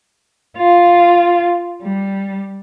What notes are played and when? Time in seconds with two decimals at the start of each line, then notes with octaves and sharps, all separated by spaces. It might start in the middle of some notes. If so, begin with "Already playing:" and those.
0.58 F4
1.83 G3